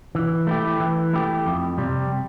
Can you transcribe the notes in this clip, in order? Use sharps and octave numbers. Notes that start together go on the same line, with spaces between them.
E3
A3 E4 G4
E3
A3 E4 G4
F2
C3 G3